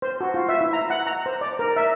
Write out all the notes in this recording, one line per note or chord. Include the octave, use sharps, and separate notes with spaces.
C5
F#4
F4
E5
E4
A#5
F#5
A#5
C5
D5
A#4
E5